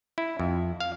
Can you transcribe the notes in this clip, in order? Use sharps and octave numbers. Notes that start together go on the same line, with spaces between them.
E4
F2
F5